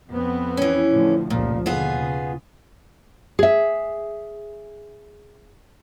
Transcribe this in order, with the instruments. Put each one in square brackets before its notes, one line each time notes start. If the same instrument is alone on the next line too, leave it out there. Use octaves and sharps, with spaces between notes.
[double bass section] F2 B3 C4
[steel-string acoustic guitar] E3 C#4
[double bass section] A2 D3 F3
[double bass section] F1 C#2 F3 [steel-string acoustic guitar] A#2
[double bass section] D#2 B2 D3 [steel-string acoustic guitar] B3 F4 G#4
[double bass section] C#3
[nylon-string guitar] G#4 E5